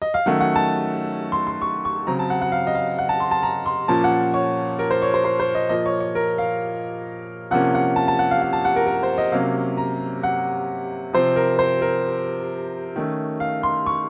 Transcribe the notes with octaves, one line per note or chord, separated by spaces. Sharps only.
D#5
F5
D#3 F#3 A3 C#4 F#5
F#5
A5
C6
C6
C#6
C#6
C#3 F#3 C4 A#5
A5
F#5
F#5
F5
D#5
F5
F#5
A5
C6
A5
A#5
C6
A#2 F3 A#3 C#4 A5
F#5
C#5
A#4
C5
C#5
C5
C5
C5
D#5
A#2 F3 A#3 D#5
C#5
C#5
A#4
F5
C3 F3 A#3 C#4 F#5
F#5
A5
A5
F#5
F5
F5
A5
F#5
A#4
A#4
C5
D#5
C3 F#3 A#3 C#4 F5
A#5
F#5
C3 F3 C4 C5
A#4
C5
A#4
D#3 A3 C#4
F5
C6
C#6